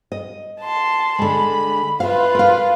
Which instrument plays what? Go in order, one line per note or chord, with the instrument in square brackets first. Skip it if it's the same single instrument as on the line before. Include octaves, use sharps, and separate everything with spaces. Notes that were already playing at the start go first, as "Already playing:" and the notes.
[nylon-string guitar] D#5
[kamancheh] A5 C6
[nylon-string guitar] D3 G#3 [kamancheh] B5
[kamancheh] F4 B4 [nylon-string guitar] E5 F5
[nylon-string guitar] A#4 F5